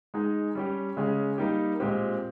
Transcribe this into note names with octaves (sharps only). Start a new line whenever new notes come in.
G#3 D#4 G#4
G3 C#4 G4
C#3 G#3 C#4 G#4
G3 A#3 D#4 G4
A#2 G#3 C4 G4